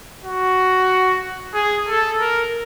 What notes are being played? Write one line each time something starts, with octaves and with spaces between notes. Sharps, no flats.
F#4
G#4
A4
A#4